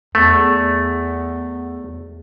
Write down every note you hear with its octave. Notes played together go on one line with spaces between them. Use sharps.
E2 A3